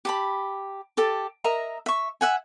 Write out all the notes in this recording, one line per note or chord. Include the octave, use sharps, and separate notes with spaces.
G4 A5 B5
G4 A4 A5
A#4 D#5 E5 A#5
E5 C#6
E5 F#5 G#5